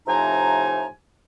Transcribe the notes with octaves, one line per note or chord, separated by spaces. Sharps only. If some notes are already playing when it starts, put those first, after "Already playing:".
A2 C3 F3 D#4 G#5 A#5